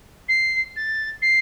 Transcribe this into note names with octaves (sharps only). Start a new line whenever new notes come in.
C7
A6
C7